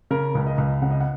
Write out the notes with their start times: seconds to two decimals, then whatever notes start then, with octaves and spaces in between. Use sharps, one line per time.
0.11 C#3 A#4
0.35 C#2
0.47 D#5
0.58 C#2
0.82 C#3 F#5
0.90 D#5
1.00 F#5